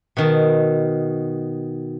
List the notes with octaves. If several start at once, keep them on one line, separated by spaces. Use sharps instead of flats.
B2 D#3 A5